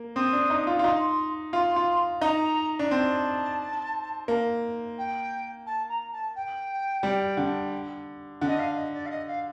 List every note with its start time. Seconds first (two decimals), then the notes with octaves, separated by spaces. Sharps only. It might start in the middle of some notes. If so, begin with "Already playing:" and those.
Already playing: A#3
0.15 C4 D#6
0.33 D4
0.50 D#4
0.67 F4
0.79 F4
0.84 D#4 C6
1.53 F4 C6
1.76 F4
2.21 D#4 A#5
2.79 D4
2.90 C4 A5
4.28 A#3
4.97 G5
5.66 A5
5.88 A#5
6.12 A5
6.35 G5
7.03 G3
7.37 D3
8.41 D3
8.47 D#5
8.59 F5
8.75 D#5
8.93 D5
9.05 F5
9.10 D#5
9.27 F5